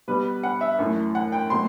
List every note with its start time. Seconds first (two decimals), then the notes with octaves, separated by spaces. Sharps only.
0.08 B2 G3 B3 B4
0.43 F#5
0.61 E5
0.78 F#2 E3 A3
1.15 F#5
1.32 G5
1.50 B2 F#3 A3 C6